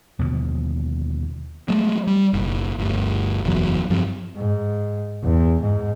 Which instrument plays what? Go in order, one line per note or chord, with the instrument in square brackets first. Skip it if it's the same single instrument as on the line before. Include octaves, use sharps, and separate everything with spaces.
[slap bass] D#2 B2 D3 F3
[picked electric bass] F#3 G#3 A3
G3
F#1 B1
G1 D2
F#1 B1 E2 F#3
G2 F3 C4
[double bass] G#2
E2
G#2